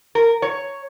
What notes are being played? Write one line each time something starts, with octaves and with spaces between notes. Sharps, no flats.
A#4
C#5